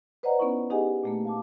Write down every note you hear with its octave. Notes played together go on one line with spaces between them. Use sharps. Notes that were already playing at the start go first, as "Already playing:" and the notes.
B4 C5 D5 D#5 F#5 A#5
B3 C#4 D#4 E4 C#6
D#4 G4 G#4 D#5 F#5 G#5
A#2 A3 A#3
F5 A5 D6